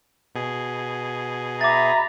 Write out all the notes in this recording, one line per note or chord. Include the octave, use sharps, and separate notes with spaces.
B2 G#4
E5 A#5 B5 D6 A6